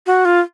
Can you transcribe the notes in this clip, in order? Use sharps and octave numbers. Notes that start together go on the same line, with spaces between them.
F#4
F4